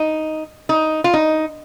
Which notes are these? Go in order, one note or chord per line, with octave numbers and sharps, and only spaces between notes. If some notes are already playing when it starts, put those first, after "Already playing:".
Already playing: D#4
D#4
F4
D#4